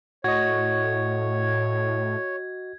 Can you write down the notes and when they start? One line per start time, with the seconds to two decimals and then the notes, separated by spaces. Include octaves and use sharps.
0.24 A2 F#4 C#5 D#5 G#6